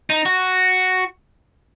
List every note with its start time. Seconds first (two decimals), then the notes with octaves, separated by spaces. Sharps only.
0.10 D#4
0.26 F#4